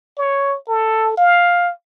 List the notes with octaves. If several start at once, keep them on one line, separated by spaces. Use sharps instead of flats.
C#5
A4
F5